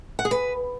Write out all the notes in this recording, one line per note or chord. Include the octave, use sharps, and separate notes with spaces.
F#5
G#4
B4